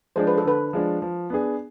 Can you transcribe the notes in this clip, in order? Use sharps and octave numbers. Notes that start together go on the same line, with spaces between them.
F3 G#3 D4 C5
B4
A4
D3 B4
F3 G#3 D4
F3
B3 D4 G#4